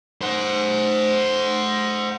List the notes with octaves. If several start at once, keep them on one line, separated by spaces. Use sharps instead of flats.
C5 F#5